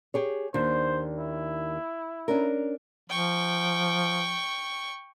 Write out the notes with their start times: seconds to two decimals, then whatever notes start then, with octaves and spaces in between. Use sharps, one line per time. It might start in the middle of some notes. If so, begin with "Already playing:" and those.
0.14 G4 G#4 C#5
0.54 D#2 D#3 D4 C5
1.19 E4
2.28 C#4 D4 A#4
3.10 F3 G5 C#6